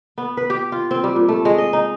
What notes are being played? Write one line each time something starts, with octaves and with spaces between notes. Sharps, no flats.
B3
B4
G4
F4
C4
G3
A#2
A3
G#3
D#5
D#4